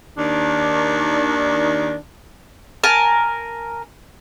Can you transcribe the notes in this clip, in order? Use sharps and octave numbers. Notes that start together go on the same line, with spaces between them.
D#2 D#3 D4
A#4 G#5 A5